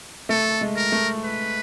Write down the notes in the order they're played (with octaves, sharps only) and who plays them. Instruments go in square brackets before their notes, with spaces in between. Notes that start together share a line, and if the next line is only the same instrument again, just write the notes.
[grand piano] A3 [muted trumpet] A4
[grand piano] G#3
[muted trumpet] A#4
[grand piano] A3
[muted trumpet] B4